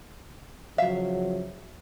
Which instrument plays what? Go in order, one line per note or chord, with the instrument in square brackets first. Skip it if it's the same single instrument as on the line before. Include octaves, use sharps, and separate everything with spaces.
[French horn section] C#3 F3 F#3 [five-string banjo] E5 F5